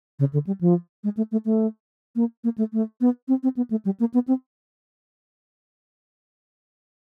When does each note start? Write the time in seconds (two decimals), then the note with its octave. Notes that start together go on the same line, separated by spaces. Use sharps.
0.19 C#3
0.33 D3
0.47 G3
0.61 F3
1.04 G#3
1.17 A3
1.31 A3
1.45 A3
2.16 A#3
2.44 A#3
2.58 A3
2.73 A3
3.01 B3
3.28 C4
3.43 C4
3.56 B3
3.70 A3
3.85 G3
4.00 A#3
4.14 B3
4.27 C4